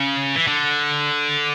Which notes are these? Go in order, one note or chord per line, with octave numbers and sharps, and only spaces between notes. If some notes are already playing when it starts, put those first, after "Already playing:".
Already playing: C#3
E3
D3